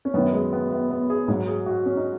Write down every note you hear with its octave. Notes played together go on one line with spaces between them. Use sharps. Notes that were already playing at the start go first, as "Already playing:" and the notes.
C#4
F#2 D#3 F#3 B3
G#3
B3
B3
B3
G#4
G#2 F#3
G#4
F#4
C#4
D#4